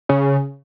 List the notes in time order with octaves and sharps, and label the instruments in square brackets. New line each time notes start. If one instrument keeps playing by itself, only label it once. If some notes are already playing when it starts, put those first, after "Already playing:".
[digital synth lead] C#3